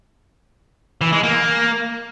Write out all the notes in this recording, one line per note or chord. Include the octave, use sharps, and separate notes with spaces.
E3
G#3
A#3